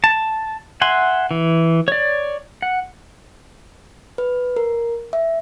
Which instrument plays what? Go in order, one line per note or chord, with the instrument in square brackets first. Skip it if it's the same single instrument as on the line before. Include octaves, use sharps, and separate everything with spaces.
[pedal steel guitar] A5
E5 F#5 G#5 C6
E3
C#5 D5
F#5
[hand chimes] B4
A#4
E5